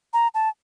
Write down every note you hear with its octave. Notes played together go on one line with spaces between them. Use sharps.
A#5
A5